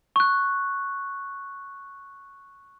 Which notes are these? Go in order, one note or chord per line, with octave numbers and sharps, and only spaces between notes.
C#6 F#6